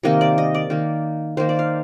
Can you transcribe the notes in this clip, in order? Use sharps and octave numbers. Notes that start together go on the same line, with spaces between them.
C3 D#3 A#3 D#5
D5
D#5
D5
D#3 A#3
D#3 A#3 C5
D5
F5